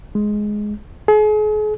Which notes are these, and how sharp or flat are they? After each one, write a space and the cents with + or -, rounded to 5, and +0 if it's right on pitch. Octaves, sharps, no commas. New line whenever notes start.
G#3 +10
G#4 +40